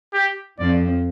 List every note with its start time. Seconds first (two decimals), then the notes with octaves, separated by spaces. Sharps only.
0.13 G4
0.59 F2 F3 D5